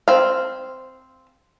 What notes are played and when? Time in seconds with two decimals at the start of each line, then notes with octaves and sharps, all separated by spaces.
0.08 C4 F5